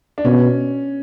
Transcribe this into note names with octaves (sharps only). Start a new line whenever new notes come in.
D4
B2 C#4